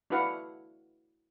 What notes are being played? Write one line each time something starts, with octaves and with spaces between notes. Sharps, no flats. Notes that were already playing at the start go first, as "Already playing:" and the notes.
D4 E4 F#4 B4 F5 F#5